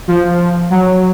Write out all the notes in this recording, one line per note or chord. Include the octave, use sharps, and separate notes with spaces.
F3
F#3